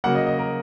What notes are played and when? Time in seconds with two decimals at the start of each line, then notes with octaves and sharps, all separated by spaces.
0.04 C#3 F#3 A#3 F#5
0.15 D#5
0.27 D#5
0.39 A#4